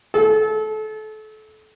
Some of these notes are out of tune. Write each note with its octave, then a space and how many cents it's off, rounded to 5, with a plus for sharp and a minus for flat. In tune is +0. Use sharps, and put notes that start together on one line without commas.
A4 -30